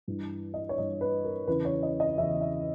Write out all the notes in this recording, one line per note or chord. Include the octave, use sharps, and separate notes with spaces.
G2 E3
D#5
C#5
G2 E3 D#5
B4
A#4
E2 C#3 E3 B4
C#5
D#5
D#5
E2 C#3 E3 E5
E5